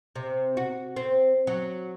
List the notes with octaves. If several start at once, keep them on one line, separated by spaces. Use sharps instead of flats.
C3
F#4
C4
F#3